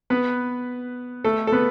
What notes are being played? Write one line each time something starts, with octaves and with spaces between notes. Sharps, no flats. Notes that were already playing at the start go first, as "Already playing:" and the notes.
B3 B4
A3 A4
A4
B3 B4